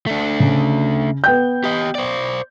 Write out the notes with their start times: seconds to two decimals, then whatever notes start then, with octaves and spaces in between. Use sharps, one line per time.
0.06 A3 D4
0.40 C#3
1.24 B3 G5 G6
1.64 G4 D#5
1.95 C5 D5